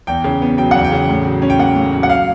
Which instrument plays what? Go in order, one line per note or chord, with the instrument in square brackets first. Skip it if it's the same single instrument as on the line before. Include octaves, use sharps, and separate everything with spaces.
[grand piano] E2 G5
C#3
B3
F#3 G5
E2 F#5
G5
C#3
A2
F#3
C#4
G5
A#3 F#5
A2
F#3
F#5
F5